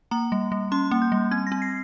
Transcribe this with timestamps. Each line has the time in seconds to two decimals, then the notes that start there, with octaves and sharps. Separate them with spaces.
0.11 A#3 A#5
0.32 G3
0.52 G3
0.72 C#4 C6
0.91 A#3
1.02 G6
1.12 G3
1.31 C4 G#6
1.47 A#6
1.52 C4
1.62 C7